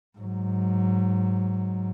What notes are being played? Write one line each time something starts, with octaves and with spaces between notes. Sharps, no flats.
G#2 F#3